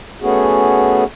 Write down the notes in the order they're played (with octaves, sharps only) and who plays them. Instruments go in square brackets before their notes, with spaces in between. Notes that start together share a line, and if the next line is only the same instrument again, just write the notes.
[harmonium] A3 B3 C#4 F#4 G#4